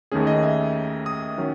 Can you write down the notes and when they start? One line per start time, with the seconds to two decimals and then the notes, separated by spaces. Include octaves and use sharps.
0.12 D#2 D#3 A3 C#4 G#4
0.27 D#5
0.43 E5
1.06 D#6
1.38 D#3 F#3 C#4